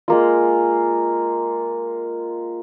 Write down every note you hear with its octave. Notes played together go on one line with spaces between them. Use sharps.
G#3 A#3 F4